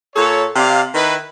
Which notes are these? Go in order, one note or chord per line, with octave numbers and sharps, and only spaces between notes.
A#2 A4 C#5
C3 D5 F5
D#3 D#4 E4 B4